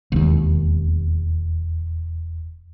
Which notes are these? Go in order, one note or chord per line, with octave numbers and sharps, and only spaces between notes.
E1 D#2